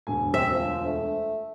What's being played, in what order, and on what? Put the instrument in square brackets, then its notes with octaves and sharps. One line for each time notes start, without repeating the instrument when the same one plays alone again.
[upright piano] E1 D2 G#5
[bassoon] C4 [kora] E5
[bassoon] F3
A3